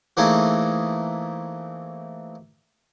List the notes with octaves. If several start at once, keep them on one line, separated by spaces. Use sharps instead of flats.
E3 A3 A#3 C4 D#4 G#4